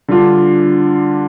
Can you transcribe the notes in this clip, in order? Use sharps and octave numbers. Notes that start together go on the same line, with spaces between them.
D3 G3 D4 F4